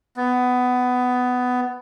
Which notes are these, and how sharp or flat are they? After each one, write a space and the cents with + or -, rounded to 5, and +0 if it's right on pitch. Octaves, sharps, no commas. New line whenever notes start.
B3 +15